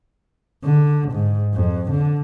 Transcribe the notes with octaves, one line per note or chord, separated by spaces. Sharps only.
D3
G#2
F2
D3